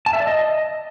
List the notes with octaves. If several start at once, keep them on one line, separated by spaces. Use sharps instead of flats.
A5
E5
D5
D#5